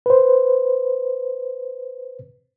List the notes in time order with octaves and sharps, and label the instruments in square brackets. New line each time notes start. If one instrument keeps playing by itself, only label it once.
[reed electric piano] B4 C5